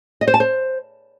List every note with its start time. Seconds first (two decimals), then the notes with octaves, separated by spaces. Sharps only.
0.21 D#5
0.28 C5
0.34 A5
0.40 C5